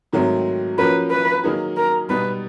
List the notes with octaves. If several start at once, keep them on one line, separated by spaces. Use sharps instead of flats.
G#2 D#3 F#3 A3 C4
F3 A#3 C#4 F#4 A#4 B4
B4
D#3 F#3 A#3 D#4 G#4
A#4
B2 G3 B3 D#4 B4